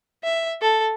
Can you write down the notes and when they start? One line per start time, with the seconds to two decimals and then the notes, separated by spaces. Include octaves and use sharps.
0.24 E5
0.62 A4